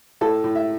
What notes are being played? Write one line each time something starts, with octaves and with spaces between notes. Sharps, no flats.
A2 A4
A2
E5